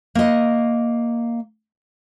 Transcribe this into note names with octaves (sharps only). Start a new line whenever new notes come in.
A#3 D#5